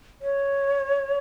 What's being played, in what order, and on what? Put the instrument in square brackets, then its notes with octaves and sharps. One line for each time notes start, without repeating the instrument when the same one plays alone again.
[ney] C#5